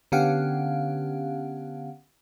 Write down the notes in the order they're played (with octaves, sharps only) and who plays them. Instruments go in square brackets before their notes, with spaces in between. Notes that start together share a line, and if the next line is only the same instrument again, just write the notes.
[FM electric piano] D3 B3 C#4 G4 F5 F#5